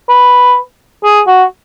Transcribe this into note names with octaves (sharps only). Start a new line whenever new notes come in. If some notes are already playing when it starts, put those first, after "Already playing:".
B4
G#4
F#4